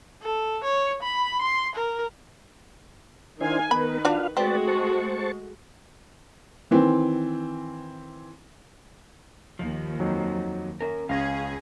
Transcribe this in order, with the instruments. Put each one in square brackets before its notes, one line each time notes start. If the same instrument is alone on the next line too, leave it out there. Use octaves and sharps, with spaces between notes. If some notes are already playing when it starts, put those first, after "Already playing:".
[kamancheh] A4
C#5
B5
C6
A#4
[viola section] D#3 F5 G#5 [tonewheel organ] D4 E4 C5
[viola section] D#3 B4 [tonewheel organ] B3 A#4 [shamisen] B5
[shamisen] D4 F#4 D5 [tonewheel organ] F4 F5
[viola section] G#3 A3 F#4 [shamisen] C4 [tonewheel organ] B4 D5 A5
[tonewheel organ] C5 A5 C#6
[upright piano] D#3 E3 C4
[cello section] D#2 [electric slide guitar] F3
[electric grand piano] F2 F#3 D#4
[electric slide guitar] C#4 A#4
[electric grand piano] C#2 A#6 [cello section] C#4 G#4 [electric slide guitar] F5